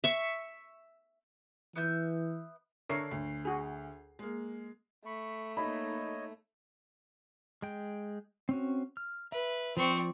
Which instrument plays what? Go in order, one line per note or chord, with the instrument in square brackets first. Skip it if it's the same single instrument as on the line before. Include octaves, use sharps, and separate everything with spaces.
[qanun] E5 C#6
[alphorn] E3 [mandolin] B3 E5 G6
[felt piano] D3 D4 C7 [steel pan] A#4 C#5 E5
[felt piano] D2
[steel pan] F#4 G#4
[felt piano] G#3 A#3
[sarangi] A3 [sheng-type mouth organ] B5 C#6
[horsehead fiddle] A#3 D#4 [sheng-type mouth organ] C#5 D#5 [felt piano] B5
[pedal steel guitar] G#3 G5
C4 C#4 F#4
F6
[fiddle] B4 [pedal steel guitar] E5
[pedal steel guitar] F3 D5 [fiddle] C4 C#6